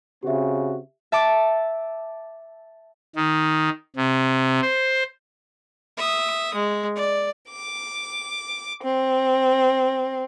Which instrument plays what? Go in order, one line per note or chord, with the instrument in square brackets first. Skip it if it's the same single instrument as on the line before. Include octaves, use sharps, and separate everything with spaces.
[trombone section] C#3 C4 F#4 [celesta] G4 E5
[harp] E5 A5 D6
[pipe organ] D#3
C3
C5
[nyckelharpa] E5 D#6
G#3
D5
[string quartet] D6
C4